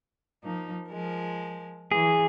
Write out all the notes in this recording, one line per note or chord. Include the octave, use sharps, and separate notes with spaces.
F3 A#3 D#4
F3 G#3 A#4
E3 G#4